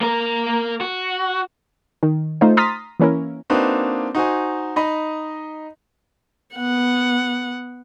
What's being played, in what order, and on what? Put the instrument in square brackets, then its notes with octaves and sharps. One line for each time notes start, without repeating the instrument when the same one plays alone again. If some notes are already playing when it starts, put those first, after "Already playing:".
[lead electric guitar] A#3 A#4
F#4
[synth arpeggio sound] D#3
A3 D#4 F4 C5
A#5 C6 D#6 F6 A6 B6
E3 A#3 C#4 E4 A#4
[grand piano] A#3 C4 D4 D#4 F#4 B4
D#4 F#4 C5 G#5
D#4 D#5 B5
[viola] B3 F#5